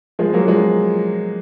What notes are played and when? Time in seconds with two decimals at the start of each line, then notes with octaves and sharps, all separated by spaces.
0.19 F3 G#3
0.33 F#3 A#3
0.47 F3 G#3